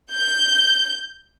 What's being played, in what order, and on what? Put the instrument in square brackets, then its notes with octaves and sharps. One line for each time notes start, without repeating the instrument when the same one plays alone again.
[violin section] G6